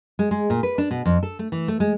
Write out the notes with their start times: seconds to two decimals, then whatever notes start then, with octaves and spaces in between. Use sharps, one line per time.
0.19 G#3
0.31 G#3
0.50 A#2
0.63 B4
0.78 D4
0.91 B2
1.05 F2
1.23 A4
1.39 A3
1.52 E3
1.68 A3
1.80 G#3